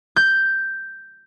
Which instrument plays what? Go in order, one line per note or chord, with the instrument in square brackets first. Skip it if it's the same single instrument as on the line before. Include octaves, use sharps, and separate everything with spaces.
[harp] G6